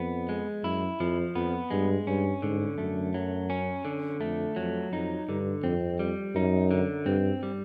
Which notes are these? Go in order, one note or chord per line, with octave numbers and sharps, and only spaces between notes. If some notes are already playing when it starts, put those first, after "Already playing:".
Already playing: F2 B3
G#3
F#2 E4
F2 F3
F2 B3
G2 G#3
G2 C#4
G#2 D3
F#2 A3
F#3
C#4
D3
F2 A3
F2 F#3
F2 D#4
G2 D3
F2 C4
G3
F#2 D#4
D3
G2 C4
G3